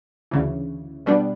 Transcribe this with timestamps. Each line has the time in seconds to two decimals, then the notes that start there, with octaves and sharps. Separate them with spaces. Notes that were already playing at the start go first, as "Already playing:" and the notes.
0.31 D2 C#3 E3
1.06 B2 G3 B3 D4